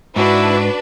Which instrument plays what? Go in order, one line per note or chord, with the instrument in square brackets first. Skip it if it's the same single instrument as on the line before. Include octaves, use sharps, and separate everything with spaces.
[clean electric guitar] G#2 [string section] D4 B4 [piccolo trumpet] E4 [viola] F#4